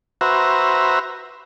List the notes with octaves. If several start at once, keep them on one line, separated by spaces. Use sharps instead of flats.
F#4 B4 C5 E5 A#5